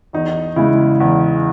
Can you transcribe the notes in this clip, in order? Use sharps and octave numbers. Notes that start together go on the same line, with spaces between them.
E2 D#4
C#3 G#3 E4
E2